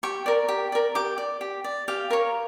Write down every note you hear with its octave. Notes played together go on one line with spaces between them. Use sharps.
G4 C#6
A#4 D5
G4
A#4 D5
G4 D6
D5
G4
D5
G4 F5
A#4 C#5